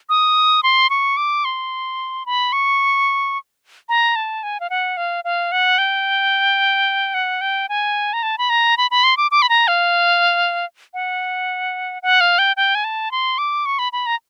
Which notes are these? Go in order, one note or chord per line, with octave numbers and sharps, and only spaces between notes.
D#6
C6
C#6
D6
C6
B5
C#6
A#5
A5
G#5
F5
F#5
F5
F5
F#5
G5
F#5
G5
G#5
A#5
A5
B5
A#5
B5
B5
C6
D6
D6
B5
A#5
F5
F#5
F#5
F5
G5
G5
G#5
A5
C6
D6
C#6
B5
B5
A#5